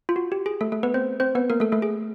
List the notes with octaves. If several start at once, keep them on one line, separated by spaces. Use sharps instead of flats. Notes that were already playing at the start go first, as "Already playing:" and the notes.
F4
F#4
G4
G#4
A3 A4
A3 A4
B3 B4
C4 C5
C4 C5
B3 B4
A#3 A#4
A3 A4
A3 A4
G#4